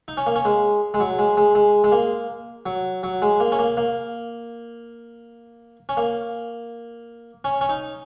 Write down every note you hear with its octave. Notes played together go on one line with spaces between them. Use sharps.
D#4
C#4
A#3
C#4
G#3
G#3
F#3
G#3
G#3
G#3
G#3
A#3
F#3
F#3
G#3
A#3
C#4
A#3
A#3
C#4
A#3
C#4
C#4
D#4